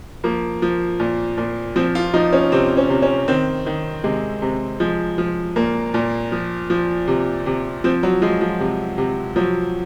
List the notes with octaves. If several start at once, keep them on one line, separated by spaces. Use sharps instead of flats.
F3 A#3
F3
A#2
A#2
F3 C4
F4
F3 D#4
C#4
C3 C4
C#4
C3
C#4
D#3 C4
D#3
C3 G#3
C3
F3 G#3
F3
A#2 A#3
A#2
F3
F3
C3
C3
F3 C4
F#3
F3 G#3
F3
C3
C3
F3 F#3